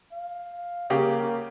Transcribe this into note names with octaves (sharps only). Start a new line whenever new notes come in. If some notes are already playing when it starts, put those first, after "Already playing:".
F5
C#3 A#3 G4